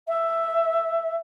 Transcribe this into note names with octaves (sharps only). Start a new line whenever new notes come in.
E5